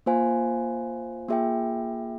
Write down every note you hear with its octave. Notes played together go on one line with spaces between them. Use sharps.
A#3 F4 C5 F5 G#5
A#3 F4 G#4 E5 G5